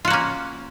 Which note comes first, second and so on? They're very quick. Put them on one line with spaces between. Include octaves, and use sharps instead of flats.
F4 F#4 A#3 C#4